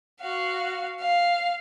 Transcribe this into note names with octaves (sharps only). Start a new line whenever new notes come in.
F#4 F5
F5